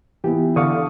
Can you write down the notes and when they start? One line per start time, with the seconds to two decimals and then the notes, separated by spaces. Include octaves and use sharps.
0.24 E3 B3 E4 F4 G4
0.56 D3 F5 C#6 D#6